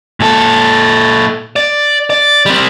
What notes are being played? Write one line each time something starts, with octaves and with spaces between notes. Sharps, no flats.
A#2 A4
D5
D5
G3 C4